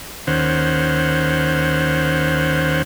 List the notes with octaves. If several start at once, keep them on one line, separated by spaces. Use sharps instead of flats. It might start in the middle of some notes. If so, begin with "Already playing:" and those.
D#2 D#3 C#4 C5 F#5